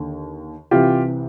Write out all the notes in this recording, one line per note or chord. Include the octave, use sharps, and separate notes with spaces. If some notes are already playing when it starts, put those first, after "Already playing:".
Already playing: D#2 D3
C2 C3 E3 F4 G4